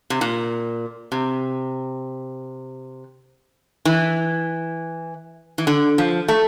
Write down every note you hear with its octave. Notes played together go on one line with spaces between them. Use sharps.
C3
A#2
C3
E3
E3
D3
F3
A3